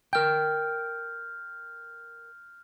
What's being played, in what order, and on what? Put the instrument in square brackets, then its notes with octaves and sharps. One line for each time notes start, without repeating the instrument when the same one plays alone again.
[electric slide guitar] A#4 G5 [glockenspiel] F6 G6